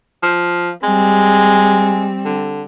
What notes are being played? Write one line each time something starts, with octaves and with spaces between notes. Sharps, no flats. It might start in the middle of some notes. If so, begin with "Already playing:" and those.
F3
G3 G#3 C4
D3